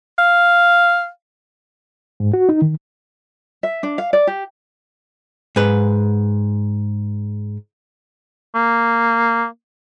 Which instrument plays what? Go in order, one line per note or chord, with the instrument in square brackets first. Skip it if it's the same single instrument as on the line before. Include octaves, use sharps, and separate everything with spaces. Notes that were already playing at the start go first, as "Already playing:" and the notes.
[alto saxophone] F5
[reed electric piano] G#2
F#4
D#4
D#3
[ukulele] E5
D4
F5
D5
G4
[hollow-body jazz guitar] G#2 B4
[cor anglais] A#3